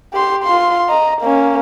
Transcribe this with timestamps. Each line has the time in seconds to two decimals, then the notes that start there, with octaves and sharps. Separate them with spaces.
0.13 G4 C6
0.44 F4 C6
0.89 D#5 A#5
1.22 A#3 C#4